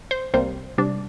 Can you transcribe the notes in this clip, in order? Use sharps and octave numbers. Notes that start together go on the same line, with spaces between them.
C5
C2 C3 G3 A#3 C5
C3 G3 D4